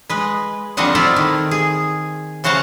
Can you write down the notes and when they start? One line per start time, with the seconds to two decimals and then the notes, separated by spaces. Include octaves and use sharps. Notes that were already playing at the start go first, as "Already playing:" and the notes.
0.09 G#3 B4
0.77 D3 F3 G3 C4 D#5 F#5
0.95 E4 F4 A4 D5
1.16 D#3
1.51 G#4
2.44 C#3 F#4 C5 F5 F#5 A5